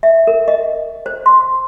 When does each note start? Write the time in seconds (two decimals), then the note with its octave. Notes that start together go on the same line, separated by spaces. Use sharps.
0.03 E5
0.27 A#4
0.48 D#5
1.06 C5
1.26 C6